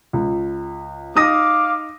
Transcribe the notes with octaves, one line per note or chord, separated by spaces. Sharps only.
C#2
D#4 F5 D6 D#6 A#6